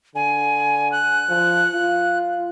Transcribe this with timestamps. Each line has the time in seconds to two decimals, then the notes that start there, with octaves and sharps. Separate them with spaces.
0.15 D3 G#5
0.92 F#6
1.29 F3
1.74 F4